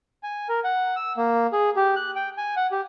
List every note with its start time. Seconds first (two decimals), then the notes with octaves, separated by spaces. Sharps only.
0.23 G#5
0.49 A#4
0.64 F#5
0.96 E6
1.17 A#3
1.52 G#4
1.76 G4
1.96 F#6
2.16 G5
2.37 G#5
2.56 F#5
2.71 G4